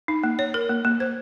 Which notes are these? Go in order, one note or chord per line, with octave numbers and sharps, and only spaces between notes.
D#4
A#3
C#5
A#4
A#3
A#3
C5